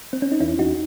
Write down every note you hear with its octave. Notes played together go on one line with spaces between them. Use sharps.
C4
C#4
D#4
E2 C#4 E4
E2 D#4 F#4